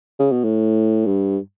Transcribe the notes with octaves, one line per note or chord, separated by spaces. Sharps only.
C#3
B2
A2
G2